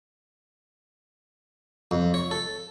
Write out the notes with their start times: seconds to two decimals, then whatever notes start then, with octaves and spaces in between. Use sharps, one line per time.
1.91 F2
2.14 C#5
2.31 A4